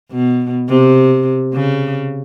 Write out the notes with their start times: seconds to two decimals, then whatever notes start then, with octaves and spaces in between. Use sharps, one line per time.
0.11 B2
0.69 C3
1.54 C#3